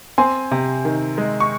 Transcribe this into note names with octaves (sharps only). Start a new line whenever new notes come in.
C4 G#5 C6
C3
D#3
G#3
C#6